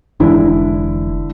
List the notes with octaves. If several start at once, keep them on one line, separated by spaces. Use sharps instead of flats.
F1 D3 E3 G#3 E4